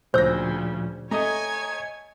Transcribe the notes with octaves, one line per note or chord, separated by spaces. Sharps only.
D2 A#2 C#3 F3 C5 E6 G6 A#6
A3 C#5 D#5 G#5 A#5 D#6 G#6